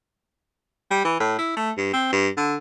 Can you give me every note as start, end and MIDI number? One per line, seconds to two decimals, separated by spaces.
0.91 1.03 55
1.05 1.15 52
1.20 1.36 45
1.38 1.54 64
1.56 1.71 57
1.77 1.90 43
1.93 2.08 60
2.12 2.29 43
2.37 2.55 50